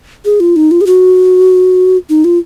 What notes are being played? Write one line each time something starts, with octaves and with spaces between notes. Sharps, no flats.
G#4
F4
D#4
F4
G#4
F#4
D#4
F4